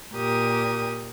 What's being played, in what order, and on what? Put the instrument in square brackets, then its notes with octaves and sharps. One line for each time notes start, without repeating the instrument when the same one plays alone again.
[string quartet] A#2 G4 A#4 D#6